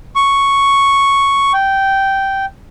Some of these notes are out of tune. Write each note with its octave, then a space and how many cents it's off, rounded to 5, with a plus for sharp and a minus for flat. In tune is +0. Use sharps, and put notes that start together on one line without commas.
C#6 +0
G5 -10